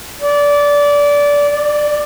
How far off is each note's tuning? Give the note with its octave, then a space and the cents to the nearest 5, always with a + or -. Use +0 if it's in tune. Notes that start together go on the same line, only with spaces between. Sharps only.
D5 -20
D5 +15